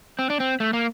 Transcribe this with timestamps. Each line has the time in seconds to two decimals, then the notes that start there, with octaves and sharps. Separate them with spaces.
0.19 C4
0.30 D4
0.40 C4
0.60 A3
0.73 A#3